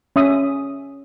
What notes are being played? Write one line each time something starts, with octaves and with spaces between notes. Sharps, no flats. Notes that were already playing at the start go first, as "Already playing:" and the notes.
C#4 E5 D#6